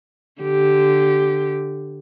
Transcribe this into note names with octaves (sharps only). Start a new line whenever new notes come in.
D3 G4